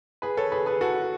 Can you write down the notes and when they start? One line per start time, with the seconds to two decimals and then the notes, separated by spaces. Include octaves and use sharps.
0.22 G#4 B4
0.37 A4 C#5
0.52 G#4 B4
0.66 G#4 B4
0.81 F#4 A4